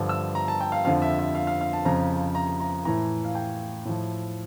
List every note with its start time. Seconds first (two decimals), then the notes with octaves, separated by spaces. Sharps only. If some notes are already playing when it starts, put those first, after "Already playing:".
Already playing: G2 D3 F3
0.09 E6
0.35 A#5
0.48 A5
0.61 G5
0.72 F5
0.85 F2 D3 F3 F5
1.02 E5
1.19 E5
1.35 F5
1.47 F5
1.61 F5
1.73 A5
1.85 F2 C#3 F3 A#5
2.35 A#5
2.60 A#5
2.85 A2 E3 A#5
3.25 F5
3.35 G5
3.85 A2 F3